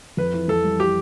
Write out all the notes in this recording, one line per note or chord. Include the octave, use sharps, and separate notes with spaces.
F2 B4
E3
F2 A4
G3
G4